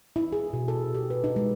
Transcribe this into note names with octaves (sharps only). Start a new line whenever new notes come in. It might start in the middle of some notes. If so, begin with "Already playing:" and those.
E4
G#4
B2
A4
G4
B4
D#4
G#3